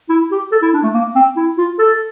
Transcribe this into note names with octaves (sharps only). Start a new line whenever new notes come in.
E4
G4
A4
E4
D4
A3
A#3
C4
E4
F4
A4